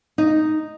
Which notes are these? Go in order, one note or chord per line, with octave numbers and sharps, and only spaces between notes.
D#4